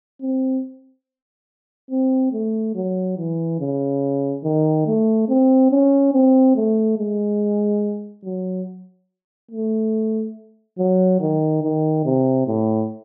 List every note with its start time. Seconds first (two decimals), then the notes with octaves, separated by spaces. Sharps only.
0.21 C4
1.90 C4
2.32 A3
2.75 F#3
3.17 E3
3.59 C#3
4.44 D#3
4.86 A3
5.29 C4
5.71 C#4
6.13 C4
6.56 A3
6.98 G#3
8.24 F#3
9.51 A3
10.78 F#3
11.20 D#3
11.63 D#3
12.05 C3
12.47 A2